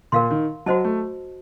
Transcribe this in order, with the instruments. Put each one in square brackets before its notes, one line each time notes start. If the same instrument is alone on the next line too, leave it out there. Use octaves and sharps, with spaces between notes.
[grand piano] A#2 [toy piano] A#4 F5 C6
[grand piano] D#3
[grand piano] F#3 [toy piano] F#4 C5 D#5 A5
[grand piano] A3